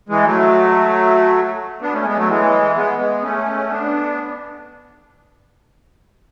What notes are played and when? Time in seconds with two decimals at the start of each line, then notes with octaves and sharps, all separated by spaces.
0.09 E3 G#3
0.25 F#3 A3
1.82 B3 D4
1.93 A3 C#4
2.05 G#3 B3
2.16 F#3 A3
2.28 E3 G#3
2.76 G#3 B3
2.98 G#3 B3
3.22 A3 C#4
3.70 B3 D4